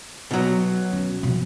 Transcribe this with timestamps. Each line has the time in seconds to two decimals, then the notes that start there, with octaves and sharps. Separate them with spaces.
0.31 B2 F#3
0.93 C#4
1.23 B2 F3